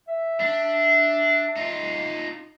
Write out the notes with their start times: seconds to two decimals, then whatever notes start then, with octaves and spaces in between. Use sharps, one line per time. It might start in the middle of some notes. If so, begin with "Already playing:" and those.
0.08 E5
0.40 D4
1.56 D#4 F4